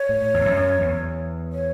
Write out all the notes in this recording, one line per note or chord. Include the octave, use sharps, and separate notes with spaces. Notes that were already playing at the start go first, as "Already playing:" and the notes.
Already playing: C#5
A2
E2
F#2
E2
C#5